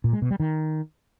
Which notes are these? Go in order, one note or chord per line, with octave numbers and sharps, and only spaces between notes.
A#2
G#3
B2
G3
D#3